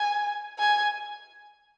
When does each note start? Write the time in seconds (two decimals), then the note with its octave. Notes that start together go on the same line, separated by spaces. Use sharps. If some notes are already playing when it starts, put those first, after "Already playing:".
Already playing: G#5
0.59 G#5